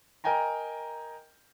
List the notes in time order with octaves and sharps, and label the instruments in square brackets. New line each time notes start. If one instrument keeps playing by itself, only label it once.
[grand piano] A#4 D#5 G5 G#5 A#5